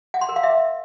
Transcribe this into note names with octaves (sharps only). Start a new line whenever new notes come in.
F#5
C6
A#4
F5
E5